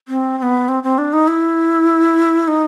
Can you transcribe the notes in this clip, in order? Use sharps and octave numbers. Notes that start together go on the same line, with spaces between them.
C4
C4
B3
C4
C4
D4
D#4
E4
D#4